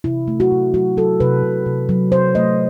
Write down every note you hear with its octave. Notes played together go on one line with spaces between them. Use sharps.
C3 E4
A3
F#4
C3
F#3 F#4
F#3 A4
C3 B4
C3
C3
F#3
C3 C5
A3 D#5